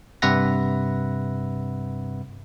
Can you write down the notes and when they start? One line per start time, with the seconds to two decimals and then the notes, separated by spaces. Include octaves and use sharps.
0.22 G2 C3 B4 E5 F#5 A#6